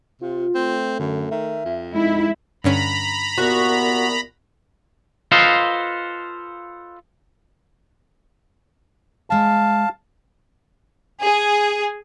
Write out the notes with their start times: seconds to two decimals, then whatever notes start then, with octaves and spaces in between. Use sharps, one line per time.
0.21 C3 F4
0.55 A3 C4
0.99 F#2 D3
1.31 D#3 E5
1.65 F2
1.94 G#3 D#4 E4
2.64 G2 D3 C#4 A#5 B5
3.38 C2 A#2 B3 F#4
5.32 F4 A4 B4 C5 D#5 F5
9.30 G#3 E5 F5 A5
11.21 G#4